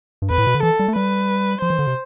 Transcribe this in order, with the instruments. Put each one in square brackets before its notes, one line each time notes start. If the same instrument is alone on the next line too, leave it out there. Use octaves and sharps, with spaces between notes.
[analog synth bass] G2
[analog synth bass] F2 [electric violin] B4
[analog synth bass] A2
B2
D3
[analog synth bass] E3 [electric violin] A4
[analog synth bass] G3
A3
[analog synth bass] G3 [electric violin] B4
[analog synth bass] F3 [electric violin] C5
[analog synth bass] E3
D3
C3